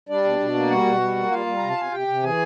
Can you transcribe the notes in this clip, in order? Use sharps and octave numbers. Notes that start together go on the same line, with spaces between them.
G3 D4 D5
B2
B2
A#3
G3 F#4 F#5
B2
G3
A#3
G3 F4 F5
G3
C3 A#5
A5
C3 G#5
C3 G4 G5
C3
E3 G#4 G#5